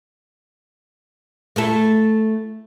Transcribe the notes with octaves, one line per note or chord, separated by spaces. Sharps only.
A3 E4 A4